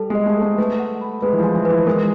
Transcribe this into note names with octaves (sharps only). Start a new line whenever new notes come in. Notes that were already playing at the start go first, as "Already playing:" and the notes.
Already playing: G3 A4 A5
G#3 D#5
A3
A3 A4
A3 B4
F#5
B5
G#3 B4
E3
F3
G#5
E3
B4
E3
G#3 A#4